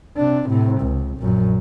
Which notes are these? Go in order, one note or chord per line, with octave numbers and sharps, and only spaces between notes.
C3 D4
A2 C3
C#2
A#1 F#2